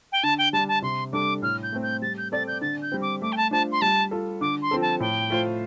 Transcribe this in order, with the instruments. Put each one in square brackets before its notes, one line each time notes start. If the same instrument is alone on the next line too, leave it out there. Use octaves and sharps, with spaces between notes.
[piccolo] G5
[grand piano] D3 [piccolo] A5
[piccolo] G5
[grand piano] G3 D4 [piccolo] A5
[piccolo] A5
[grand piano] C3 [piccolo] C6
[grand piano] G3 D4 A4 [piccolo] D6
[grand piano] A2 [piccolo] F6
[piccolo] G6
[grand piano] A3 C4
[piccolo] G6
[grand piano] G3 [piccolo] A6
[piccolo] G6
[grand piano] C4 A4 D5 [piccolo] A6
[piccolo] G6
[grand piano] D3 [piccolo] A6
[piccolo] G6
[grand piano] G3 C4
[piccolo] D6
[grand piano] A3 [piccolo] D6
[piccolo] G5
A5
[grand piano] D4 F4 C5 [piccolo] A5
[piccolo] C6
[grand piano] G3 [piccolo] A5
[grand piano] F4 A4
[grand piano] D3 [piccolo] D6
[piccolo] C6
[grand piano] F3 C4 A4
[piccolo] A5
[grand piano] A2 [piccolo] G5
[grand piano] A3 F4 C5